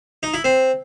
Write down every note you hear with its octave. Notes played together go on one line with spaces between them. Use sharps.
D#4
E4
C4